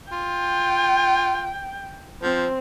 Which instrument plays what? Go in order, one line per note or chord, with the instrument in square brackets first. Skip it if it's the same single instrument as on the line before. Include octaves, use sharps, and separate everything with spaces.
[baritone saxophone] F4 [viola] G5
[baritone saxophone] F3 [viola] C4